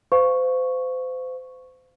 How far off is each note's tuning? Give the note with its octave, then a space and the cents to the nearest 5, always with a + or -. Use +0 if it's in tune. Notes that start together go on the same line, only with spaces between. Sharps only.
C5 -35 F5 +0 C#6 +0